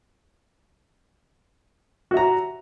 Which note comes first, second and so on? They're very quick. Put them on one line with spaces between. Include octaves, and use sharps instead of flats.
F#4 E5 A#5